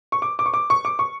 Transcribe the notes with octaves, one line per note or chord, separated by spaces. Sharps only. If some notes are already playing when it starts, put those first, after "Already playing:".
C#6
D6
D6
C#6
D6
C#6
D6
C#6